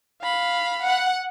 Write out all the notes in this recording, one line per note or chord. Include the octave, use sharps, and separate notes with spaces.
F5 B5
F#5